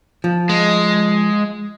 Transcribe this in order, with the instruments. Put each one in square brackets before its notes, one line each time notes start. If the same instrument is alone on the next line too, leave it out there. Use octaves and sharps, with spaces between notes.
[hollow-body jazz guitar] F3
[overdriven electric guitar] G#3